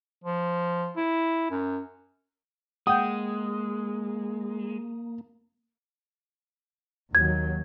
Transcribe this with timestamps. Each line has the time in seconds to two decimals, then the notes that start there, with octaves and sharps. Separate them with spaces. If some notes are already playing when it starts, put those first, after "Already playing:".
0.24 F3
0.96 E4
1.51 F#2
2.87 G#3 A#3 F#5 G5 D#6 G6
7.15 D#2 D#3 F#3 G#6